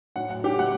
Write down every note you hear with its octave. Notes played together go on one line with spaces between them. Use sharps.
A2 F#3 F#5
F#5
G4 G5
A2 F#3 F#5 F#6